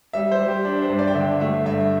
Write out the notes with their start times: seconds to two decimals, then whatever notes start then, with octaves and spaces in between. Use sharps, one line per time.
0.13 G3 E5
0.32 C5
0.39 G3
0.48 G4
0.65 D4
0.82 C5
0.90 G2
0.99 D5
1.07 G5
1.15 D3 E5
1.40 A3 E5
1.65 G2 E5